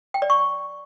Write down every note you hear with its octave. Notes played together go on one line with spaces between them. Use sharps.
G5
D5
C#6